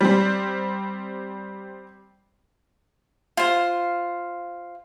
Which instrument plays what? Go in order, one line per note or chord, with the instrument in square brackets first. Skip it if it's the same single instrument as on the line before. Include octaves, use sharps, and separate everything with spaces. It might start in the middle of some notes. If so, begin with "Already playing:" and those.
[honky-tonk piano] G3 C4
[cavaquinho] F4 C5